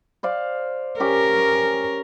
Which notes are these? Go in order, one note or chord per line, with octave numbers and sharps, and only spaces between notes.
C5 D5 F5
C#4 G4 A#4 D6